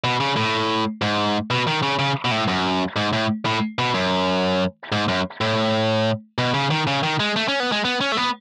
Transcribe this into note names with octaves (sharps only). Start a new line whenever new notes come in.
B2
C#3
A2
G#2
B2
D#3
C#3
C#3
B2
A2
F#2
G#2
A2
A2
B2
F#2
G#2
F#2
A2
B2
C#3
D#3
C#3
D#3
G#3
A3
C#4
B3
G#3
B3
C#4
A3
B3